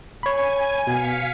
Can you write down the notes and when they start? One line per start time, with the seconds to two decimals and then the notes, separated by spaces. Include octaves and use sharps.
0.23 C#5 G#5 B5
0.87 B2 F5 B6 C#7